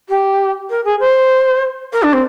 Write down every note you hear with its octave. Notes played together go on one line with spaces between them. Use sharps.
G4
A#4
G#4
C5
A#4
D4
C4